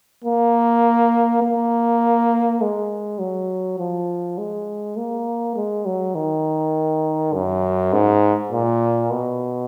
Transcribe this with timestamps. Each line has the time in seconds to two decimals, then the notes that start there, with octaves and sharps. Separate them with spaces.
0.24 A#3
1.43 A#3
2.61 G#3
3.19 F#3
3.79 F3
4.38 G#3
4.97 A#3
5.56 G#3
5.85 F#3
6.15 D#3
7.34 F#2
7.93 G#2
8.51 A#2
9.11 B2